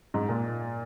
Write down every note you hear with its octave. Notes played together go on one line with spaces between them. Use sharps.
G#2
A#2